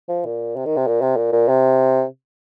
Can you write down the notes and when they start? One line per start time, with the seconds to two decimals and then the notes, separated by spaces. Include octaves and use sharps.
0.09 F3
0.25 A#2
0.56 C3
0.66 D#3
0.77 C3
0.87 A#2
1.02 C3
1.17 A#2
1.32 A#2
1.48 C3